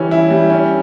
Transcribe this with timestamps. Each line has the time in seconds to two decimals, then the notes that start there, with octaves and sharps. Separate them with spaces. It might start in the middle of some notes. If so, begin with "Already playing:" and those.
Already playing: E3 G3 C#4 E4
0.11 E4
0.31 G3
0.50 C#4